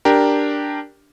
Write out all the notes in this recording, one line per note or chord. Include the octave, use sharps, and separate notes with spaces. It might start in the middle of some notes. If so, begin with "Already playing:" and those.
D4 G4 A#4